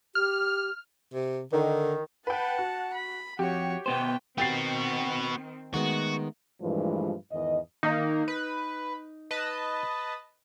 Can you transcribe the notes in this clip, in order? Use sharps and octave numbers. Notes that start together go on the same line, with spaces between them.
G4 F6
C3
D3 D#3
B4 F#5 G5 A5
F#4
B5
F2 F#4 G4 C#5
B2 B3 B4 C5 G5
D#3 B3 C4 F#4 G5 A6 C7
D#3 G#3 A3 B3 F#4
G2 A#2 E3 F3 G#3 A3
E2 G#2 D#3 D#5
D#3 A#3 D#4
B4
B4 D#5 A5